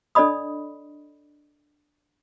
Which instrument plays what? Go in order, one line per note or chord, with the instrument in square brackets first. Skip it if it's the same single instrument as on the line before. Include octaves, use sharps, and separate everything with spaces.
[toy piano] D4 A4 D5 D#5 B5 D#6